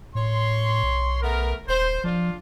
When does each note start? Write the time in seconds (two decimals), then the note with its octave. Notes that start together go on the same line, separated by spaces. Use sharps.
0.15 A2 C#5 C6
0.83 B1
1.22 A3 B3 A#4
1.68 D#1 C5
2.04 F3 D4 F4